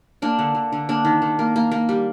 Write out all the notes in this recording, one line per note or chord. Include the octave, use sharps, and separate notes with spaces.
A#3 D4
D3
D3
D3
A#3 D4
D#3
D#3
A#3
A#3
A#3
G3